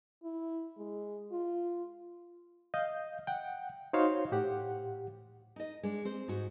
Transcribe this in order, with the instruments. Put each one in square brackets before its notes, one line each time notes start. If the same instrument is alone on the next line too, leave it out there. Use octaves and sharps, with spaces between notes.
[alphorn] E4
G#3
F4
[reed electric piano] D#5 F5 G6
F#5 G5
D#4 F#4 C5 C#5 F5 C6
A2 G4 F#5
[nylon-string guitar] D#4 D#5
G#3 D4
C4 C5
G#2 F#4